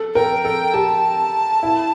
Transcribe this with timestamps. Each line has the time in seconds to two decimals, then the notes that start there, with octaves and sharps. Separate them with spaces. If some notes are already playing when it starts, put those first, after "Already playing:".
Already playing: A4
0.15 A#4 G5
0.44 A4 G5
0.73 G4 A5
1.63 E4